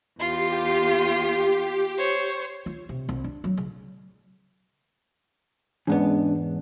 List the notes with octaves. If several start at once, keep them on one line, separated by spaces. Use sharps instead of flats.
E2 F4 G4 C6
C5 C#5 C#6
F4
C3
C2
D4
F#3
C#3
E2 G#2 G#3 B3 C#4 D4